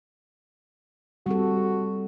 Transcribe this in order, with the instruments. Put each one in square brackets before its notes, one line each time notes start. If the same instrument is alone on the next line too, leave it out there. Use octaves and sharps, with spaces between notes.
[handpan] G3 C4 A4 [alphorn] F#4